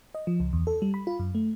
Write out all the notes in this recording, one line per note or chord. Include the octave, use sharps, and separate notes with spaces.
D#5
F3
C#2
E2
A4
G3
B5
F4
F#2
A3